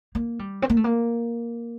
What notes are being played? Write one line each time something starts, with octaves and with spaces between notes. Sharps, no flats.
A#3
G3
C4
A#3
A3
A#3